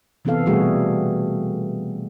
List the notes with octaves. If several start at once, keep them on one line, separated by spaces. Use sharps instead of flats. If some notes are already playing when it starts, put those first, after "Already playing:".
C3 E3 B3 C4 A4 F5
B2 E3 G3 A3 F#4 G#4